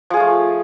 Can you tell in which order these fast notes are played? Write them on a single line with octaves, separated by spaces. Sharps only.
F3 G#4 F4 A3